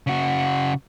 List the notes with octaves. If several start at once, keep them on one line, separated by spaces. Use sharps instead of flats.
C#3 F#4